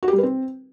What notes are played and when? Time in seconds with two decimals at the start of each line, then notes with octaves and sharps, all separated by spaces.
0.03 F#4
0.08 G4
0.13 G3
0.18 B4
0.23 C4